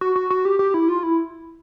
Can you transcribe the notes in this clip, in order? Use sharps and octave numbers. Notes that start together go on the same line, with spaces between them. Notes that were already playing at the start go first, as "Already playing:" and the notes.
F#4
F#4
F#4
G4
G4
E4
F4
E4